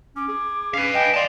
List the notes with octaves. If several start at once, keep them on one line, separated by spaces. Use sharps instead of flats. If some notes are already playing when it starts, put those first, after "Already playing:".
C#4 D6
G#4
C#4 B4 F5
D#5 G5 G#5
D5 D#5 F5 A5 C6